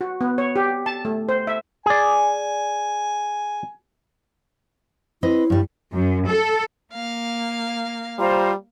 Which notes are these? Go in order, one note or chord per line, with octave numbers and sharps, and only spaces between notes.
F#4
B3
C#5
G4
A5
A3
C5
E5
G#4 D5 G#5
C4 E4 B4 D#5
G2 G3
F#2
A4
A#3 F5
G3 F4 C5 A#5